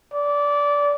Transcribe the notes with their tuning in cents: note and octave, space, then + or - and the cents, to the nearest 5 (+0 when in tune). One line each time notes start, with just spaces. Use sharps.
D5 -20